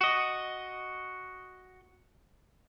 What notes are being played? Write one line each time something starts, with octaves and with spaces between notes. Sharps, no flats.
F#4 D#5